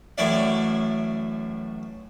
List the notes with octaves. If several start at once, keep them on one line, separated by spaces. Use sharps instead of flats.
A1 F#2 E4 C#5 D5 E5